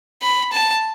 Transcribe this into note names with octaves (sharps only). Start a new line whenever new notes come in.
B5
A5